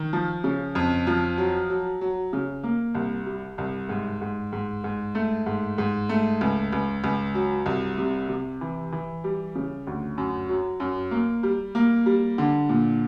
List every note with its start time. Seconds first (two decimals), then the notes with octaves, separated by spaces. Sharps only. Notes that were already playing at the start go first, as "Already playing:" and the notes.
Already playing: D#3
0.13 F3
0.44 C#3
0.75 F2
1.07 F3
1.38 F#3
1.70 F#3
2.01 F#3
2.33 C#3
2.64 A#3
2.95 C2
3.26 G3
3.58 C2
3.89 G#2
4.21 G#2
4.53 G#2
4.84 G#2
5.15 A3
5.46 G#2
5.78 G#2
6.09 A3
6.41 C#2
6.73 C#2
7.04 C#2
7.35 F#3
7.66 C2
7.98 C3
8.29 C3
8.61 E3
8.92 E3
9.24 G3
9.55 C#3
9.87 D2
10.18 F#2
10.49 F#3
10.80 F#2
11.11 A#3
11.43 G3
11.75 A#3
12.06 G3
12.38 D3
12.69 A#2